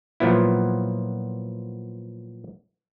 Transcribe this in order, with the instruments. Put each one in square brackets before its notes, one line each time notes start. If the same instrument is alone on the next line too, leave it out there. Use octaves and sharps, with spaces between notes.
[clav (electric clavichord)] A#2 F3 F#3 B3 E4